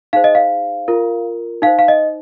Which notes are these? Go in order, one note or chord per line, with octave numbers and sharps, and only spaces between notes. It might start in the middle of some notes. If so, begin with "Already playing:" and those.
D#4 G#4 C5 F5
D#5
F5
F4 A#4
D#4 C5 F5
F5
D#5